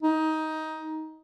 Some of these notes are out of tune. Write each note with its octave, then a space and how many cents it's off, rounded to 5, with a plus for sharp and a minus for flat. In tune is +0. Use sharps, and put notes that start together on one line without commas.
D#4 +15